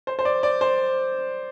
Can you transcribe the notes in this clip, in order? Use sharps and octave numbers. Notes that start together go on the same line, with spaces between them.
C5
C5
D5
D5
C5